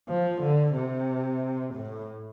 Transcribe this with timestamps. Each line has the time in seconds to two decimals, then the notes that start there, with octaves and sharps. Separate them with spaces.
0.08 F3
0.41 D3
0.75 C3
1.74 A2